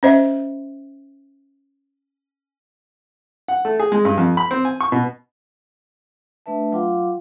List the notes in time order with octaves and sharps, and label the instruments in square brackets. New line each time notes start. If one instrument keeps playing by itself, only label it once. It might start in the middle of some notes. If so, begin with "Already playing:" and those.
[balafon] C#4 C5 D#5 E5
[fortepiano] F#5
A3
G#4
G#3
G2
F2
B5
C4
G#5
C#6
B2
[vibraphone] A3 D4 B4 E5 A5
F#3 F4 F5 G5 C6 D6